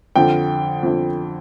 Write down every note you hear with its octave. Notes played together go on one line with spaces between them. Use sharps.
F2 D3 G5
F2 D3